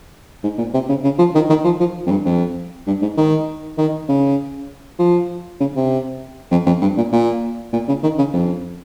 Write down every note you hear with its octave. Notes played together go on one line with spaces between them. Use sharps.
G#2
A#2
C3
C#3
C#3
F3
D#3
D#3
F3
F3
F2
G2
F2
G2
G#2
D#3
D#3
C#3
F3
C#3
C3
F2
F2
G2
A#2
A#2
A#2
C#3
D#3
C#3
F2